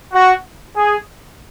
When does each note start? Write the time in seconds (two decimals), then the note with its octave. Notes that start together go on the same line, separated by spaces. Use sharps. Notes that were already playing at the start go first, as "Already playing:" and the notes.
0.13 F#4
0.76 G#4